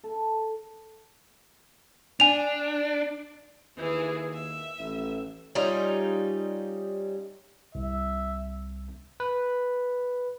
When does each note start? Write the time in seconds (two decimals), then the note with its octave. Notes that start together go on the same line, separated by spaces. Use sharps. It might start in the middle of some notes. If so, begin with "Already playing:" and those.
0.04 A4
2.20 D4 G#5 F7
3.77 D#2 E3 G#4
4.33 E5
4.78 A1
5.55 G3 C#4 D#4 F4
7.75 C2 E5
9.20 B4